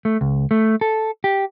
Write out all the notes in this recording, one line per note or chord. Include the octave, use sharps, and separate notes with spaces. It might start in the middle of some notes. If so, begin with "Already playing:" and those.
A3
C#2
A3
A4
G4